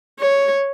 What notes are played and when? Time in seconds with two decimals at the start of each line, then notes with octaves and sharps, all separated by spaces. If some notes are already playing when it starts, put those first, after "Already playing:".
0.19 C#5